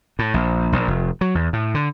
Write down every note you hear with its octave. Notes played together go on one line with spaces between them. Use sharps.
A2
A#1
A#1
F1
F#3
E2
A2
D3